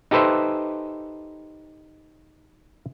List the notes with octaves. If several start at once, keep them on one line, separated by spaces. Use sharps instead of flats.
D#4 G4 A4 B4 C5 E5